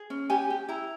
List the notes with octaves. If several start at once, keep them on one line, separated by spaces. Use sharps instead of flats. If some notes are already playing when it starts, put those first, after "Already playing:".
Already playing: G#4
C#4
G4 G#5
G4
E4 A#5